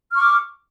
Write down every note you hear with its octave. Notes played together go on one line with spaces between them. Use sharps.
C#6 D6 F6